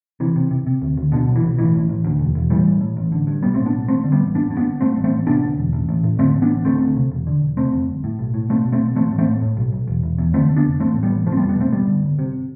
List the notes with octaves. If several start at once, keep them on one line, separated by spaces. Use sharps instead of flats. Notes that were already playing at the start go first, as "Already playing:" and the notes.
C3 E3
C3
C3
C3
D2
D2
B2 D3
B1
E3
B1
A2 E3
A1
A1
D2
E1
E1
A2 E3 G3
A1
A2
A1
D3
G2
B1 G3 B3
A3 C4
A2
B3 D4
B1
A1 A3 C4
D3
G3 B3
A1
G2 B3 D4
G2
B3 D4
G1
G2 A3 C4
A1
A3 C4
A1
C3 B3 D4
D2
E1
A1
A1
A2
D3 A3 C4
A1
B3 D4
A1
D2 A3 C4
D2
C3
E1
D3
E1
C3 A3 C4
F2
G1
A2
B1
A2
B2 A3 C4
B2
A3 C4
B1
A1 A3 C4
A1
A3 C4
A2
A2
B1
B1
E1
E1
E2
D3 A3 C4
D3
B3 D4
F1
A1 A3 C4
A2
G3 B3
A1
F1 F3 A3
C4
G3 B3
F1
G3 B3
B2 A3 C4
G2 G3 B3
D3
G1
C3